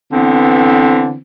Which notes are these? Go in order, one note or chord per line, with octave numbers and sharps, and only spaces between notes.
D3 E3 B3 C4